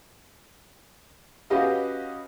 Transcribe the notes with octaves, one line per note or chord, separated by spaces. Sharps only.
C#4 F#4 G4 B4 D#5 F5